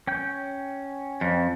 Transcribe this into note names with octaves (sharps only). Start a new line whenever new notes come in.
C#4 G5 G6
F2